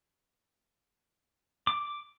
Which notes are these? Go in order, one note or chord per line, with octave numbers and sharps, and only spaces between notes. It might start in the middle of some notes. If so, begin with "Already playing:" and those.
D6